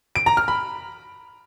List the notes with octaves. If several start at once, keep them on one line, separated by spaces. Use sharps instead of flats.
D7
A#5
F6
B5